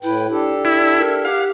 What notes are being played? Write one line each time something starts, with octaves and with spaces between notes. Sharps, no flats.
A2 E4 B4 G5
D4 G4 A4
E4 D5
A#4
G4 F5 F#5